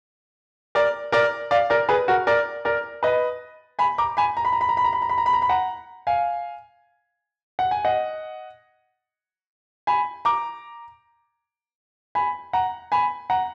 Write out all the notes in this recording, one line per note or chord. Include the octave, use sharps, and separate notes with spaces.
A#4 D5
A#4 D5
D5 F5
A#4 D5
G#4 B4
F#4 A#4
A#4 D5
A#4 D5
B4 D#5
G#5 B5
A#5 D6
G#5 B5
A#5
B5
A#5
B5
A#5
B5
A#5
B5
A#5
B5
A#5
B5
A#5
B5
F#5 A#5
F5 G#5
F#5
G#5
D#5 F#5
G#5 B5
A#5 D6
G#5 B5
F#5 A#5
G#5 B5
F#5 A#5